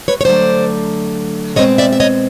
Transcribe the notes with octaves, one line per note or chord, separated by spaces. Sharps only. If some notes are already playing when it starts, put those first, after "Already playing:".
B4 C#5
C#5
D3 F#3 A3 C5 D5
B2 G#3 C4 C#5 D#5
D5 E5
E5
C#5 D#5